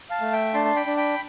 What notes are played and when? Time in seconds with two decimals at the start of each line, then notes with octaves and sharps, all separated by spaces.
0.10 F5 A5
0.21 A3
0.33 E5 G5
0.54 D4 A5 C6
0.65 A5
0.76 G5 B5
0.86 D4
0.97 G5 B5